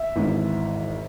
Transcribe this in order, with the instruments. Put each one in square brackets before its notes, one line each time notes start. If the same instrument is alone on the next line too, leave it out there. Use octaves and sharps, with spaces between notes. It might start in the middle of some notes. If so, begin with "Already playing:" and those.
Already playing: [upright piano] E5
G#1 G#2 E3